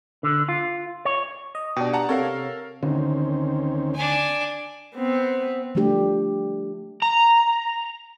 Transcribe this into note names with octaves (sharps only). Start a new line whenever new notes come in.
D3
F4
C#5
D#5
B2 D4 G4
F#5 A5 A#5
C3 A4 A#4 C#5 F5
D2 D3 D#3 C4 C#4
D4 G#5
B3 C4
F3 G3 A3 D4 G4
A#5